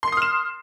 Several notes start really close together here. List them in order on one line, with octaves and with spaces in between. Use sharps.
C6 C7 D#6 F6 E7